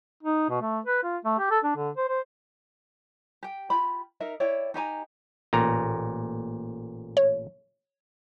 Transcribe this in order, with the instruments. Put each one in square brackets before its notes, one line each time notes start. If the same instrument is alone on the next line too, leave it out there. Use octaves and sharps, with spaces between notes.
[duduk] D#4
B2
A3
B4
F4
A3
G4
A4
D4
D3
C5
C5
[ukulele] G4 G5
F4 G4 B5
D#4 A#4 E5
E4 C#5 D5 G5
D#4 G4 G#5 A#5
[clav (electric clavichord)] A1 A#2 A#5
[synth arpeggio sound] C#5